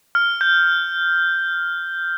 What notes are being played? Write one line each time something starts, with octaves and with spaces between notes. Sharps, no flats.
F6
G6